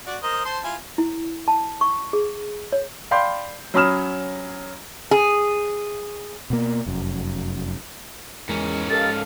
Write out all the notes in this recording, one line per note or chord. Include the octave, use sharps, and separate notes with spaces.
F#4 D5
A#4 C5 D#5
C5 A5 C6
E4 F4 G#5
E4
A5
C#6
G#4
C#5
D5 F5 G5 B5 C6 G6
F#3 C#4 B5 D#6 F6 E7
G#4
B2 A#3
F1 F#2
E2 G#2 G#3 C#4 A#4
G4 A4 A#4 D#5 F5 A6